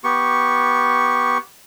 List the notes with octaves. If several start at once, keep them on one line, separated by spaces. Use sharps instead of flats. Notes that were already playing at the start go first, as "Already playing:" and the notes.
B3 G4 C#6